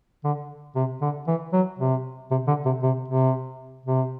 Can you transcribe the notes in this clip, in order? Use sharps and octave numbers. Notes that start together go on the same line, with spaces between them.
D3
C3
D3
E3
F#3
C3
C3
D3
C3
C3
C3
C3